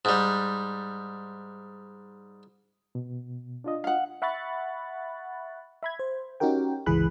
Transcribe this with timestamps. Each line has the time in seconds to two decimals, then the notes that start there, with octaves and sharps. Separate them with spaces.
0.05 G#2 G3
2.95 B2
3.64 D4 F4 D#5
3.84 F5 F#5
4.22 E5 F#5 B5 C#6 F#6 A6
5.83 E5 B5 G#6
5.99 C5
6.40 C#4 D#4 F#4 G4 A#4 G5
6.86 G1 C#2 E3 G#4 B5 F#6